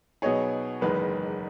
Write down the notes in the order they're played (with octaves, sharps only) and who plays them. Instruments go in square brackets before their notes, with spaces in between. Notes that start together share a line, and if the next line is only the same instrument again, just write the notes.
[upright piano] B2 F#3 B3 D#4 G#4 [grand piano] C#5
[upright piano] F#1 E2 D#3 G#3 [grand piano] B4